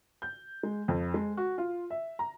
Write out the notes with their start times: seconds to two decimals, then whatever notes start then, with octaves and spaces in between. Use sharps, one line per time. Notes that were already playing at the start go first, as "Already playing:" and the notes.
0.22 G6
0.63 G#3
0.88 F2
1.14 G#3
1.37 F#4
1.58 F4
1.90 E5
2.19 A#5